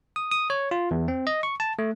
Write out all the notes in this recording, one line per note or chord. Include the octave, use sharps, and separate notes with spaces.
D#6
D#6
C#5
F4
E2
C4
D#5
C#6
A5
A3